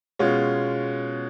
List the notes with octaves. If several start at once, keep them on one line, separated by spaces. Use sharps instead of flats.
B2 G#3 C#4 F4